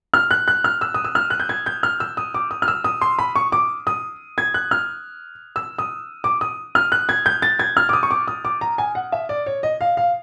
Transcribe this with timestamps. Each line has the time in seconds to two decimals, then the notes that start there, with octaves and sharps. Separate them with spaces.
0.14 F6
0.31 F#6
0.48 F#6
0.64 F6
0.81 E6
0.94 D#6
1.04 E6
1.15 F6
1.30 F#6
1.40 G6
1.49 G#6
1.66 G6
1.83 F6
2.00 E6
2.17 D#6
2.34 D6
2.51 D#6
2.62 F6
2.68 E6
2.84 D#6
3.01 C6
3.19 B5
3.36 C#6
3.52 D6
3.87 D#6
4.38 G#6
4.54 F#6
4.71 F6
5.56 E6
5.79 D#6
6.24 D6
6.41 D#6
6.75 F6
6.92 F#6
7.09 G#6
7.26 G6
7.42 A6
7.59 G#6
7.77 F6
7.89 D6
7.93 D#6
8.03 C#6
8.11 D6
8.28 D#6
8.45 D6
8.61 A#5
8.78 G#5
8.95 F#5
9.12 E5
9.29 D5
9.46 C#5
9.63 D#5
9.81 F5
9.97 F5